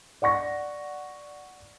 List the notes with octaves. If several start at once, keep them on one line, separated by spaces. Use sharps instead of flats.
D5 F#5 C#6 A#6